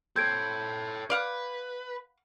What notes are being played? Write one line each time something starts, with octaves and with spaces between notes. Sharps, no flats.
C4 A4 C#5 G6 G#6 D7
B4 D5 F5 F#5